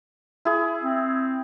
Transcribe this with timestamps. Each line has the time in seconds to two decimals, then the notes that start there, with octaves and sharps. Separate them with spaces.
0.45 E4 G#4
0.83 C4